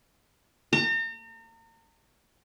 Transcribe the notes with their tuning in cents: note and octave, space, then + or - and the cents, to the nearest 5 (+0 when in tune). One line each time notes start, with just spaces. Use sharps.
A#5 -40